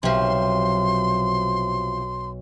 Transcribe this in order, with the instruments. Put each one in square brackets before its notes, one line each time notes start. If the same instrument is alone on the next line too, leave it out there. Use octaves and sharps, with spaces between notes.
[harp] B1 [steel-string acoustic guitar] C3 F3 [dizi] C6